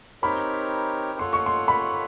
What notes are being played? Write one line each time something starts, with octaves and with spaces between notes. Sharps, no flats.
C4 D#4 G4 A#4 C#5 B5
F4 A4 C#5 F#5 C6
C#6
C6
B5